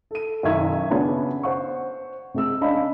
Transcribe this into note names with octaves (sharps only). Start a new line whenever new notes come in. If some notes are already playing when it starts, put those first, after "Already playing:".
A4 D#7
F#1 B1 D#3 E5 C#6 G#6
C#3 B3 C#4 D4
C5 F#5 C#6
C3 G#3 E6
C#4 D4 D#5 F5 B5